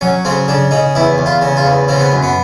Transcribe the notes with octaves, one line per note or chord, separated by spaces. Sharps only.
F#3 C#4
C#3 C4
C#3 D4
C#3 D#4
E2 E4
E2
F4
C#3
F4
E2
C#3 C4
B3
F#2
B3